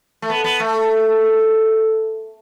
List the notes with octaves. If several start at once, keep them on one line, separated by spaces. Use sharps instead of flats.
A3
B3
B3
A3